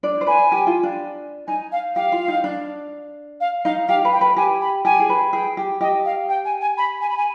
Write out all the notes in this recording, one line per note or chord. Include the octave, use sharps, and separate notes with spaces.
D4 D5
C5
B4 G#5
G4
F4
D4
D#4 G#5
F5
G4 F5
F4
D#4
D4
F5
D#4 F5
G4 F5
B4
G5
B4
G4 G#5
B5
G4 G#5
G#4
B4
G#4 G5
G4
G4 D#5
F5
G5
G#5
G#5
B5
G#5
B5
G#5